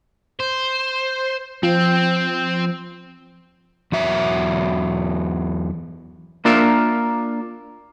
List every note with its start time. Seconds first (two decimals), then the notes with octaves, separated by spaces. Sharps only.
0.40 C5
1.63 F3 C4
3.92 E2 F#3 E5
6.45 A#3 D4 F4 A#4 E5